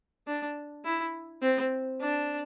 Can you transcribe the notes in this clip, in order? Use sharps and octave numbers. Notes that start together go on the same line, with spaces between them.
D4
E4
C4
D4